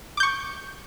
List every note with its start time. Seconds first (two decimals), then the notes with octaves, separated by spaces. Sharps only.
0.17 D6
0.20 G6
0.23 C#6